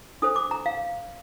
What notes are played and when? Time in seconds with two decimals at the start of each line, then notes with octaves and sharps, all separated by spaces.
0.22 D4 A4 C5 D#6
0.36 D6
0.51 A#5
0.66 F5